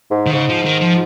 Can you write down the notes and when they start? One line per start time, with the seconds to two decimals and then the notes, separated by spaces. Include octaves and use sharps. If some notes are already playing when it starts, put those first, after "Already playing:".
0.11 G#2
0.26 D#3
0.33 G#2 C#3
0.49 F3
0.65 D#3
0.81 F3